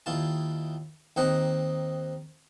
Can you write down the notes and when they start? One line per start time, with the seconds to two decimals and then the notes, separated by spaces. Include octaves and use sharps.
0.06 D#2 E4 F4 A5
1.16 D#2 C4 D#4 F#5 A#5